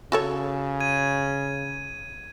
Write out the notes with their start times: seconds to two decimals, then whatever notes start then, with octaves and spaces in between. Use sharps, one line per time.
0.12 C#3 F#4 A4 C#5
0.80 G#6 D#7